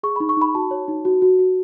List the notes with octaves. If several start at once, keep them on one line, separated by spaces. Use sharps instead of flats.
G#4 C#6
D#4 B5
C#6
D#4 B5
F#4 A5
C#5
D#4
F#4
F#4
F#4